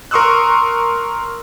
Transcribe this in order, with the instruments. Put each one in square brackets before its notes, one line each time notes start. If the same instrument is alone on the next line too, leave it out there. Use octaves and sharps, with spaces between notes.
[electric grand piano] A#4 C6 C#6 D#6 E6 F#6